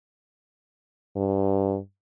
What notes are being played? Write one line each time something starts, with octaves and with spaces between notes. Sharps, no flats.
G2